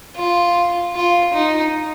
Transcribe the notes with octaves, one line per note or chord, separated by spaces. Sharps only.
F4
F4
D#4